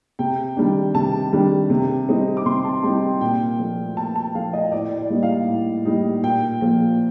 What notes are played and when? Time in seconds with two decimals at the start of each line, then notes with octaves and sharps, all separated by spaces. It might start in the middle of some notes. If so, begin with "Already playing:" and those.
0.19 C3 G5
0.57 D#3 G3 D4
0.95 C3 A5
1.33 D#3 G3 D4
1.70 C3
2.08 G3 C4 D#4
2.37 D6
2.46 C3 C6
2.64 A5
2.84 G3 C4 D#4 G5
3.03 G5
3.21 A#2 G5
3.59 F3 A3
3.97 A#2 A5
4.16 A5
4.35 F3 A3 F5
4.53 D#5
4.72 A2 D5
4.98 D5
5.10 G3 A#3 D#4
5.23 F5
5.48 A2
5.85 G3 A#3 D#4
6.23 A#2 G5
6.61 F3 A#3